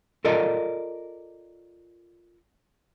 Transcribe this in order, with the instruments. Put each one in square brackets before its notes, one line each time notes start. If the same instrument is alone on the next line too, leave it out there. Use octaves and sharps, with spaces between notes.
[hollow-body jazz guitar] F4 A4 A#4 D5 D#5